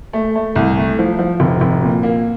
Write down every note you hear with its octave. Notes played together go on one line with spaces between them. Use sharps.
A3
A3
C2
A3
F3
F3
F1
F1
A#2
A#3